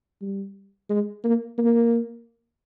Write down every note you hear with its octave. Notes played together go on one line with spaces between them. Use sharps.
G3
G#3
A#3
A#3